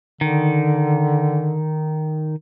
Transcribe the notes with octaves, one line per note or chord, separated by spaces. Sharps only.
D3 D#3